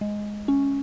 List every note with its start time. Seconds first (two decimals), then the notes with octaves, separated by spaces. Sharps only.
0.01 G#3
0.48 C#4